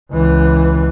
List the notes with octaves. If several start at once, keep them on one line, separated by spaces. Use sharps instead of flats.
C#2 E3